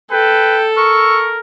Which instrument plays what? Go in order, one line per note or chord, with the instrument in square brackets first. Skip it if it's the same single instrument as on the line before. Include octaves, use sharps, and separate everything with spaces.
[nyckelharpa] A4 [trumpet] B4 [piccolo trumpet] G5
[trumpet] A#4 [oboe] C#6 [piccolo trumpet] E6